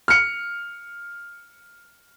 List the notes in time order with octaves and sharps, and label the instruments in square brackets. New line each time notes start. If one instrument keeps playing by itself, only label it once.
[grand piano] F6 C#7